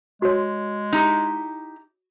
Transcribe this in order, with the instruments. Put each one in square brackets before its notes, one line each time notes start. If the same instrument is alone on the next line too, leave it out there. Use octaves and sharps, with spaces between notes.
[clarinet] G#3 [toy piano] F#4 C#5
[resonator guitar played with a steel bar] D#4 E4 G4